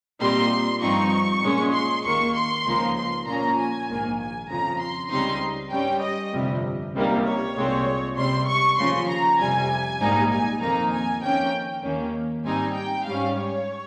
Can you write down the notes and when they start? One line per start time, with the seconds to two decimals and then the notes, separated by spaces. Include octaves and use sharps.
0.20 A#2 G3 C4 D#4 C6
0.81 G2 F3 C4 D#4 C#6
1.42 A#2 G#3 C#4
1.73 C6
2.04 D#2 D#3 A#3 C#6
2.34 C6
2.65 C#2 C#3 F3 A#3 D#4
2.95 C6
3.26 A#2 F3 A#3 C#4 A#5
3.56 G#5
3.88 A#1 G#2 D#3 A#3
4.18 G#5
4.48 F2 C#3 F3 A#5
4.79 C6
5.10 C#2 C#3 G3 C4 D#4 C6
5.71 G2 G3 C#4 G5
6.01 D#5
6.32 G1 F2 C3 G3
6.93 C#2 C3 G3 A#3 D#4
7.24 C#5
7.54 C2 A#2 G#3 C4
8.15 C#2 C3 G3 C6
8.46 C#6
8.77 D#2 C#3 F3 C6
9.08 A#5
9.38 F2 C3 G3 G#5
9.99 A#1 G#2 G3 A#3 D#4
10.30 G#5
10.60 F2 D#3 A#3 D#4 A#5
10.91 G#5
11.22 F2 D#3 A#3 C#4 G5
11.83 D#2 D#3 A#3 C#4
12.44 G#2 G3 C4 D#4 G#5
12.75 G5
13.05 G#2 G3 C#4 F5
13.36 C#5